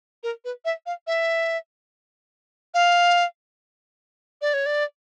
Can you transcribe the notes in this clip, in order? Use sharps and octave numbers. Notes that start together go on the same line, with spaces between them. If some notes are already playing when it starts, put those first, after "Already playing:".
A#4
B4
E5
F5
E5
F5
D5
C#5
D5